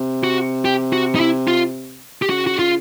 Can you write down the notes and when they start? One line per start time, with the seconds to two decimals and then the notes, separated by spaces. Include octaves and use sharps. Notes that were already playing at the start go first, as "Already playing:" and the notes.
Already playing: C3
0.24 F#4
0.65 G4
0.93 F#4
1.15 D#4
1.20 E4
1.48 F4
2.22 G4
2.30 C#3 F#4
2.47 F#4
2.59 F4